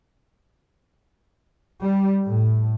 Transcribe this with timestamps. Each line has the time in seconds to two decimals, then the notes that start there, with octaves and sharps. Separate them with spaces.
1.83 G3
2.23 A2